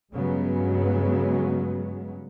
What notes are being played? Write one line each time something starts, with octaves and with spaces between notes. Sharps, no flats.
G2 C#3 F#3 G#3 B3